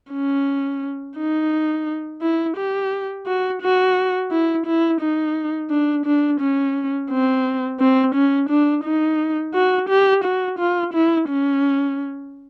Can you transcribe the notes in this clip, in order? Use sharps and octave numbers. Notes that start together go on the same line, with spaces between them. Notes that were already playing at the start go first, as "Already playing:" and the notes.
C#4
D#4
E4
G4
F#4
F#4
E4
E4
D#4
D4
D4
C#4
C4
C4
C#4
D4
D#4
F#4
G4
F#4
F4
E4
C#4